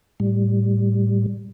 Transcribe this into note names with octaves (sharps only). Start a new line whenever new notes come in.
A2 G3